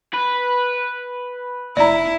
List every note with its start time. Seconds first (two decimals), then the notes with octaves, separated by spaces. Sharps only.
0.14 B4
1.77 F1 E4 D5 A#5